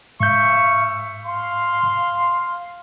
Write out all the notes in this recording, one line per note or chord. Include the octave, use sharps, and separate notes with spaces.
G#2 E5 F5 C#6 G6
F5 C6